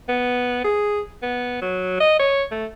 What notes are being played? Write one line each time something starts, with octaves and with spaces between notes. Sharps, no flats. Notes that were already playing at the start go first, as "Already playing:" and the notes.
B3
G#4
B3
F#3
D#5
C#5
A3